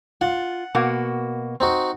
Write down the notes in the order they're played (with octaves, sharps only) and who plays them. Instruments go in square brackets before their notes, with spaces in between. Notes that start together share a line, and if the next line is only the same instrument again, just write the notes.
[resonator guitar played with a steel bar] F4 [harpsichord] F#5
[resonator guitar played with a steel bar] B2 A#3 F#4
[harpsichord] C4 D#4 F#4